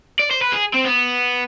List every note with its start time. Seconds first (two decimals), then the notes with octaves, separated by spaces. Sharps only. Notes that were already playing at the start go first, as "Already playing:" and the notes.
0.19 D5
0.31 C5
0.42 B4
0.52 G#4
0.74 C4
0.85 B3